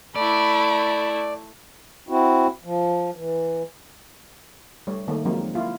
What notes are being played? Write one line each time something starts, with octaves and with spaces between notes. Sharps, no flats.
A3 E4 D5 B5
C4 E4 F#4
F3
E3
G3 A3 C#5
D#3 A3 A#3
F3 F#3 G#3 A#3 C4 D#4
A#3 E4 F4